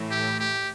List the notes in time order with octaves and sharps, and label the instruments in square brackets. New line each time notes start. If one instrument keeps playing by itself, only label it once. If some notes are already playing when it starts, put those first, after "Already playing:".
Already playing: [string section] A2 E3 A3
[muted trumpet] G4
G4